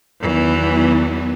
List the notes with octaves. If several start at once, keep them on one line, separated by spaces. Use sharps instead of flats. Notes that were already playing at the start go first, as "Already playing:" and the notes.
E2 D#3 E3 F#3 B3